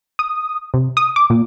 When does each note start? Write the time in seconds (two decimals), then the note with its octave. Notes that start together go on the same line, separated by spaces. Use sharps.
0.19 D#6
0.74 C3
0.97 D#6
1.16 D6
1.30 A#2